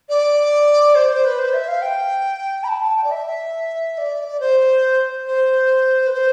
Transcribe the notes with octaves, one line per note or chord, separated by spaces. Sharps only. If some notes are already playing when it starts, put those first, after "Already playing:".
D5
C5
C5
B4
C5
E5
F5
G5
B5
A5
A5
G5
D5
E5
D5
D5
C5
C5
B4
C5